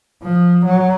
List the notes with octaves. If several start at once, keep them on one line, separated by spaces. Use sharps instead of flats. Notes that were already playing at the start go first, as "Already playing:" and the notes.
F3
F#3